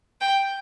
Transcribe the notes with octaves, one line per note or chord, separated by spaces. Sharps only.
G5